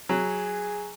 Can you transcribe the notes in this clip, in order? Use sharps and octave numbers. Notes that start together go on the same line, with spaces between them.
F#3 G#4